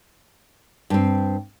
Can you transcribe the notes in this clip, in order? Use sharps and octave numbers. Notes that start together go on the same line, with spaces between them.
G2 C4